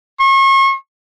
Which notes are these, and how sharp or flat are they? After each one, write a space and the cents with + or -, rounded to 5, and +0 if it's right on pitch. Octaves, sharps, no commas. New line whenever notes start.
C#6 -40